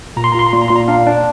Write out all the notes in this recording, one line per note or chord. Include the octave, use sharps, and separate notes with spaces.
A#2 A#5
C6
A#5
F4 C6
A#5
A#2 C6
A#5
A#2 C6
A#5
D4 F5
D4